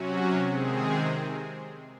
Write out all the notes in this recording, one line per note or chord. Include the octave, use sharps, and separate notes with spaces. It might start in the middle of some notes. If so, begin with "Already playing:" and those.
Already playing: C3 F#3 C#4 F#4
C3 D#3 G#3 C4 G#4